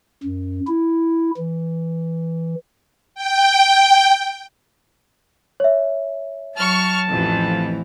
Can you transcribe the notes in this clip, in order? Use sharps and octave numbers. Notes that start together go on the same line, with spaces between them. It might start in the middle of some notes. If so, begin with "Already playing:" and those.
F#2
E4
E3
G5
C#5 E5
F#3 A5 C#6 F6
A1 F2 E3 F3